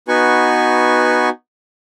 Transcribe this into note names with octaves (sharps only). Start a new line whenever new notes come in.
B3 D#4 F#4 B4 G#5 C#6